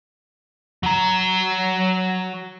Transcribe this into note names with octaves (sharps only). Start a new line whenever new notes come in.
F#3 A#5